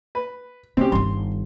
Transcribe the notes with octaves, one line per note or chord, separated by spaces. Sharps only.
B4
D3 C4 C#4 G4
G1 D#3 C6